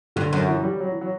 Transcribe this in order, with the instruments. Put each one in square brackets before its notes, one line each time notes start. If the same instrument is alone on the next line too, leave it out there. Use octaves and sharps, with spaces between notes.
[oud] G2 [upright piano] D3
[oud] F#2
[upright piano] E3
F#3
G3
F#3
E3
F#3